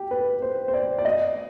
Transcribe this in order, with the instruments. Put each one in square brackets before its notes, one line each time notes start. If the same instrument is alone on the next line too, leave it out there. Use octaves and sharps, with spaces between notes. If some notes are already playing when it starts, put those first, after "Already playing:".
Already playing: [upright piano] G4
B4
C5
C5
D5
D5
D#5